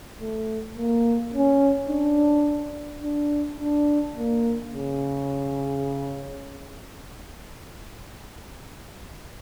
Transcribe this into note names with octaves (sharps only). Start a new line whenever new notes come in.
A3
A#3
C#4
D4
D4
D4
A#3
C#3